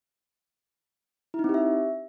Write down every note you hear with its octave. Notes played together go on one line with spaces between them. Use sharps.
E4
D#4
C4
G4
E5